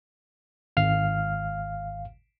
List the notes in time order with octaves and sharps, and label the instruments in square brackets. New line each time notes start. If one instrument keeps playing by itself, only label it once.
[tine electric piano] G#1 F5 F6